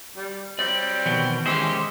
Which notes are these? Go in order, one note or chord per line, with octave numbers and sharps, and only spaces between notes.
G3
F#3 G3 C4 D5
B2 D#3 E3 G5
G#3 C#4 E4 G4 C5